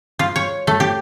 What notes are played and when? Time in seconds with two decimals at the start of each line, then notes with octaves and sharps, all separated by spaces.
0.19 F4
0.36 C#5
0.67 A3
0.80 G4